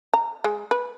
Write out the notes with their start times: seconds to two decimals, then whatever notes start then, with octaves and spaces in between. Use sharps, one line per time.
0.14 A#5
0.44 G#3
0.71 B4